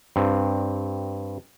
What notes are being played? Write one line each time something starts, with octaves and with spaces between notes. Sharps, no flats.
G2 C4